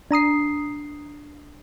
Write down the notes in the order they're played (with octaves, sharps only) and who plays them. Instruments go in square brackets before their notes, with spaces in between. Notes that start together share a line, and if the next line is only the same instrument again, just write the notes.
[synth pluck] D4 A#5 D#6 C7